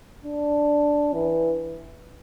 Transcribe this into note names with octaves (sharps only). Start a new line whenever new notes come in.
D4
E3